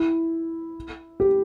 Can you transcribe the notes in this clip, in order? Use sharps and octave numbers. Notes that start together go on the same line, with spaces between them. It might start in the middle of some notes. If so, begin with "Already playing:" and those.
Already playing: E4
G4